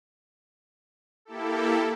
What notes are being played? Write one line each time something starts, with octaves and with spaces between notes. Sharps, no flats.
A#3 E4 G4 A4